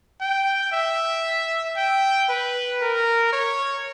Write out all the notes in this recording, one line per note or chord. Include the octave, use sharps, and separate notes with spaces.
G5
E5
G5
B4
A#4
C#5